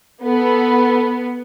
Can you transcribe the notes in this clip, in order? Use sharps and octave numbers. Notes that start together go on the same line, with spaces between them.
B3 A4